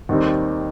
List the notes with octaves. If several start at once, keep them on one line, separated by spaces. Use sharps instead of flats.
D#2 D#3 G3 C4 D#4